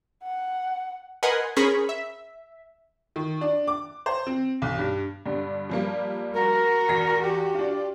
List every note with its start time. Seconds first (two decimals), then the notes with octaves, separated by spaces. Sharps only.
0.23 F#5
1.23 A#4 B4 D#5 F#5 G#5 C6
1.56 C#4 G#4 A#4 C5 B5 C#6
1.89 E5
3.16 D#3
3.41 D4
3.67 D6
4.06 C5
4.27 C4
4.62 B1
4.78 G2
5.26 G2 D3 G3
5.69 F3 G3 A#3
6.34 F#4 A#4
6.89 E2 A#6
7.22 G4
7.55 D4 F4